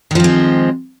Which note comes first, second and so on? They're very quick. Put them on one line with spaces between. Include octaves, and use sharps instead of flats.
D#3 F3 C4 G#3